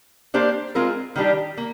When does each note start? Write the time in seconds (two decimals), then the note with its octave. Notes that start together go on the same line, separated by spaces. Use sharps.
0.34 A#3 D4 G4 C5
0.75 G#3 C4 F4 A#4
1.16 D#3 G3 D4 G4
1.57 A#3